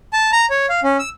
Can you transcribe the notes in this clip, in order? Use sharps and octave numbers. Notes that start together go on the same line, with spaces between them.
A5
A#5
C#5
F5
C#4
E6